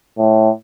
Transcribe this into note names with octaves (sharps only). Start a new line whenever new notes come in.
A2